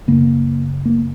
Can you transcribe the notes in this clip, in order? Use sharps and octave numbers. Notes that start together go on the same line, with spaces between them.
F#2 C#3 A#3
A#3